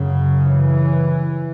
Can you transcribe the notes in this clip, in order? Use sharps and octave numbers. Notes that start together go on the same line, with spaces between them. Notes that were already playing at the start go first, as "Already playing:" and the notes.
Already playing: F#2 C#3
E3